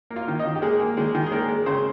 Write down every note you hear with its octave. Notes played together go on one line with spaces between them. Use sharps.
A#3
F4 F5
D#3
D#4 D#5
D#3
G4
G#3 A#3 G#4
A#3
D#3 G#3 G#4
D#3
G#4
G#3 A#3 A#4
G#3
C#3 C4 C5